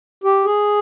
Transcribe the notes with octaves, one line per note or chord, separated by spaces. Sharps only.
G4
G#4